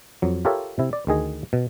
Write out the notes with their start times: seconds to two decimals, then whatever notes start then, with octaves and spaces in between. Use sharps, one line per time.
0.22 F2 F#3
0.45 F4 G4 A4 A#4 C#5 E5
0.79 C3 E4
0.93 D5
1.07 D2 D#3 G#4 D#5
1.53 B2